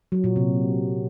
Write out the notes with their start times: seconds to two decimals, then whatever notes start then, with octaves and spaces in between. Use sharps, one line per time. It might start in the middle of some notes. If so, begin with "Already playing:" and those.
0.12 F#3
0.24 A#2
0.36 C3